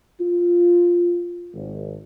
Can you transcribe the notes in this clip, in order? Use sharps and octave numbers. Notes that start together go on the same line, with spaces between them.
F4
G#1